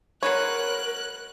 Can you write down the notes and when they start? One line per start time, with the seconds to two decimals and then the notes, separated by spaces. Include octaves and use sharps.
0.23 F#3 G#3 A#4 B4 C#5 F#6